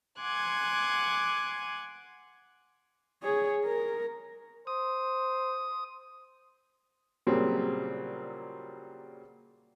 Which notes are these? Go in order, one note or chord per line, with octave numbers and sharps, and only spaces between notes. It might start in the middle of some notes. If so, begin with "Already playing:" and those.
F#5 G#5 C6 D6 F#6 G#6
G#4 C#5
A#4
C5 D#6
A#2 C#3 F#3 G3 C4